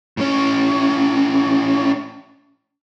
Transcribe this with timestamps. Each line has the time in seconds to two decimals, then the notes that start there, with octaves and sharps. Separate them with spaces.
0.17 A2 C#4